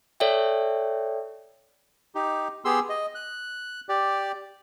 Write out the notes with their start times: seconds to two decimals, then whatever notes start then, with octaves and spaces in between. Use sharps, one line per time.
0.20 A4 C#5 D5 E5 G5
2.15 D#4 G4
2.65 B3 G4 G#4 C6 E6
2.89 D#5
3.15 F#6
3.89 G4 D5